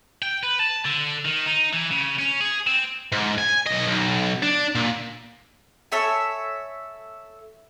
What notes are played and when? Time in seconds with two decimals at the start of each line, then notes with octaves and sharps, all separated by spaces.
0.22 G5
0.43 B4
0.59 A5
0.85 D3
1.25 D#3
1.46 D#4
1.73 E3
1.91 C#3
2.19 C#4
2.41 G#4
2.67 C4
3.12 G#2
3.38 G#5
3.67 B1 D#5
3.88 B1
4.43 D4
4.75 A#2
5.92 A4 C#5 E5 G#5